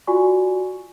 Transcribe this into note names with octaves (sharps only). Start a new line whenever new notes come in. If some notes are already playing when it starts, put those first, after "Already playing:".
F4 F#4 D5 G#5 C#6